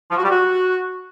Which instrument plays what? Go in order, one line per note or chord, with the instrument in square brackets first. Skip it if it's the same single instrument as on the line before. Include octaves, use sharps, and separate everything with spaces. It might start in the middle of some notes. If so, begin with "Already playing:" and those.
[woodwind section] F3
F#4
G3
F#4